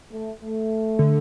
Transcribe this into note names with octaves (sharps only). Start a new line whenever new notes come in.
A3
A3
D3